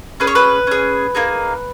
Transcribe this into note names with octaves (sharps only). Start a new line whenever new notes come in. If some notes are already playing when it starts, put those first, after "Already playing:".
C#4 G#4 B4
C#5
B4
C#4 G#4
A#3 D#4 G#4